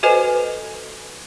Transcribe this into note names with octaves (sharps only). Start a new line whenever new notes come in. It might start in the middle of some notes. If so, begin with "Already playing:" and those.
F#4 A4 B4 C5 D#5 G#5